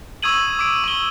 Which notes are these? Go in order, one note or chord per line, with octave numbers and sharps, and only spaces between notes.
C#6 D#6 E6 G#6 D#7 F#7
D6 D7
C#6 G7